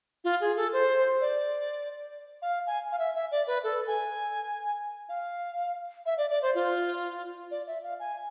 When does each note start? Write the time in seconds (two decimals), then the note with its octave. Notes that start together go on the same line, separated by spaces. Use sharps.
0.24 F4
0.41 G#4
0.56 A4
0.73 C5
1.21 D5
2.42 F5
2.67 G#5
2.92 F5
2.99 E5
3.15 E5
3.31 D5
3.47 B4
3.64 A4
3.87 G#5
5.09 F5
6.06 E5
6.18 D5
6.30 D5
6.42 C5
6.55 F4
7.51 D5
7.67 E5
7.83 F5
8.00 G#5